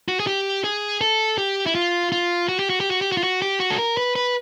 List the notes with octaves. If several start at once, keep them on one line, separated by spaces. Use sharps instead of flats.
F#4
G#4
G4
G#4
A4
G4
E4
F4
F4
F#4
G4
F#4
G4
F#4
G4
F#4
F4
F#4
G4
F#4
A4
A#4
B4
B4